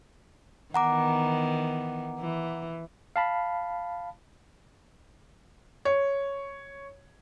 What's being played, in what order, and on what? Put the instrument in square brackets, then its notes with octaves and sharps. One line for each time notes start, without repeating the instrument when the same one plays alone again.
[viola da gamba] D#3 E3 B3 [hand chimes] F#5 A#5 D6
[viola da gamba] E3
[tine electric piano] F5 A5 B5
[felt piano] C#5